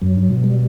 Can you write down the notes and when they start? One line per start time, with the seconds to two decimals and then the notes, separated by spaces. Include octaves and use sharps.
0.02 F#2 F#3
0.16 G2
0.29 B2
0.44 G3